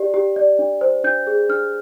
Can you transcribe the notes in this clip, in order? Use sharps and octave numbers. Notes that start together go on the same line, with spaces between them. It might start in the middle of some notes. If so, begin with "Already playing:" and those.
Already playing: G4 D5
G4
D5
D4
C5
D4 G6
G#4
D4 F6